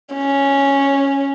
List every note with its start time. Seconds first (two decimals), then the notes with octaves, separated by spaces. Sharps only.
0.15 C#4